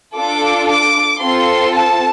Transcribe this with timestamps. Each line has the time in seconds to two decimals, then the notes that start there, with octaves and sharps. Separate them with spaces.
0.16 D4 F4 A4 D6
0.68 D6
1.21 C4 F4 A4 C6
1.73 A5